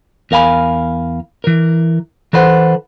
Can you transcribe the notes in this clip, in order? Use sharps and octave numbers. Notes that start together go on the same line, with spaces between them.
E2 A#4 F5 G#5 B5
E3 A#4
E3 A4 B4 C5 F#5